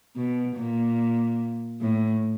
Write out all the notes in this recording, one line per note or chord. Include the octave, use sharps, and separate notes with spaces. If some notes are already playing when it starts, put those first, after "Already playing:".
B2
A#2
A2